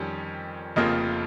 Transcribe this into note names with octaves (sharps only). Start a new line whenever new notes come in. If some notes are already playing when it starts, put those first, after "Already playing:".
Already playing: F2 D#3 G3 C#4
F1 F2 C#3 F3 A#3 D#5